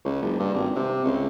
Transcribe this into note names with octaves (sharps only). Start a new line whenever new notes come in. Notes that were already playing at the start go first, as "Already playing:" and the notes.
C#2
F#1
G2
G#1
C3
C#2